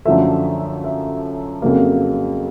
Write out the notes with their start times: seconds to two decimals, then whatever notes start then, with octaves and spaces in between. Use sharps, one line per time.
0.05 F#2 D3 F3 A3 E5
0.84 E5
1.62 F2 C#3 F#3 A#3